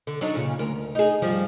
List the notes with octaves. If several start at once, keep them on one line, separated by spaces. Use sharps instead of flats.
D3
F#3 D4 D#4
A#2 C#3
D2 A#4
D#4 G#4
G2 F3 G3